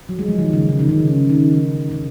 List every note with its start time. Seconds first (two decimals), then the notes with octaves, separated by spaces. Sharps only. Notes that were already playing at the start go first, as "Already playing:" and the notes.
0.09 F#3
0.19 G#3
0.28 F3
0.39 D#3
0.53 C#3
0.69 C#3
0.79 D#3
0.89 C#3
1.30 D#3
1.91 C#3